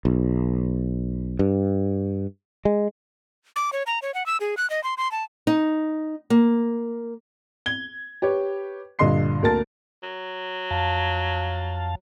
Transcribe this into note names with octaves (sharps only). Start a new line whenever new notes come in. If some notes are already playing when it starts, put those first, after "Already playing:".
B1
G2
G#3
D6
C#5
A#5
C#5
F#5
E6
G#4
F#6
D#5
C6
C6
A5
D#4
A#3
G#6 G7
G4 B4 C#5
A#1 G2 D3 D#5 C6 C7
D2 A#3 A#4 A5 A6
F#3
F2 F5 A5